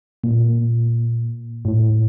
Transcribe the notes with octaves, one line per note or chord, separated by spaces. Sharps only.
A#2
A2